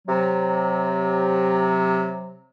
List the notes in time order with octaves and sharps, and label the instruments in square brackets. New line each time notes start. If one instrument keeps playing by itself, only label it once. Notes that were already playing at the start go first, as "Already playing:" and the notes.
[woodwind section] C3 F#3